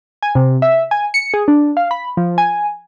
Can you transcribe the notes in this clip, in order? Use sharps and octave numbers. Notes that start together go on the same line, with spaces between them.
G#5
C3
E5
G#5
C#7
G#4
D4
F5
B5
F3
G#5